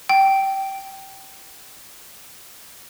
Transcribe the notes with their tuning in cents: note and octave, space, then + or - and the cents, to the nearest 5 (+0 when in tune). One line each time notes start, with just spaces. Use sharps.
G5 -15